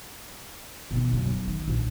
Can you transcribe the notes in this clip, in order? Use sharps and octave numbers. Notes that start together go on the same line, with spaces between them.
B2 D#3
F#2 C#3
D#3
A#1